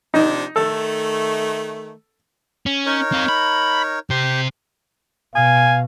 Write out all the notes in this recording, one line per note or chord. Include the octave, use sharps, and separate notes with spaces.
C3 F3 D4 D#4
D#3 A3 A4
C#4
D#4 A#4 C#5
C4 F5
B5
C3 G4 C5
B2 F5 G#5